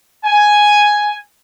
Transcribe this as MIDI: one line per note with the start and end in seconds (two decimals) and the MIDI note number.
0.25 1.15 80